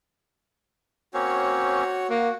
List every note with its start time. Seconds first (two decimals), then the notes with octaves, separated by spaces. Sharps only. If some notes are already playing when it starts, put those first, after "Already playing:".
1.14 A#3 C4 C#4 F#4 C#5
2.10 A#3 F#4